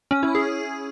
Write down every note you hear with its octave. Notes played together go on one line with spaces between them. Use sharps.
C#4
E4
G#4